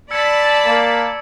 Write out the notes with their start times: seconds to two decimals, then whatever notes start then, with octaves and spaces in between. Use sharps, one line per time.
0.11 D5 A5 B5 E6 G#6 C#7
0.65 A#3